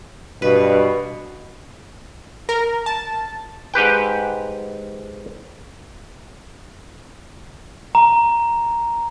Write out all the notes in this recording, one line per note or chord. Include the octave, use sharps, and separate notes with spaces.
G2 B2 B4
A#4
A5
G#2 G4 B4 G5
A#5